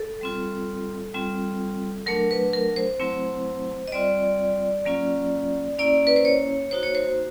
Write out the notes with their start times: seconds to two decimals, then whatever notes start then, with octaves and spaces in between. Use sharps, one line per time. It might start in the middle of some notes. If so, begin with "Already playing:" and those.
Already playing: A4
0.21 G3 C4 F4
1.14 G3 C4 F4
2.06 F#3 A3 D4 A#4
2.31 B4
2.53 A#4
2.76 C5
3.00 F#3 A3 C4 E4
3.88 D#5
3.92 G3 C4 F4 D5
4.85 F#3 A#3 C#4 F4
5.79 A#3 C#4 E4 D5
6.07 B4
6.16 C5
6.25 C#5
6.71 A#3 D#4 F#4 C5
6.83 C#5
6.95 C5